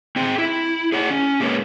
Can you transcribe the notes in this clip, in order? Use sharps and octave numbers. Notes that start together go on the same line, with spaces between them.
C4 G#4 G5
E4
G#4 C#5 F#5
C#4
G#3 A#3 G#4 A#4 B4 C#5